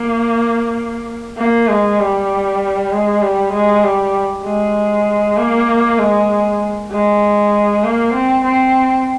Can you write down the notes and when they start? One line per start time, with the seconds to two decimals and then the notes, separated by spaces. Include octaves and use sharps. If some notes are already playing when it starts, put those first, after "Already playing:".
Already playing: A#3
1.38 A#3
1.68 G#3
1.99 G3
2.91 G#3
3.22 G3
3.53 G#3
3.84 G3
4.45 G#3
5.37 A#3
5.99 G#3
6.91 G#3
7.84 A#3
8.15 C4
8.45 C4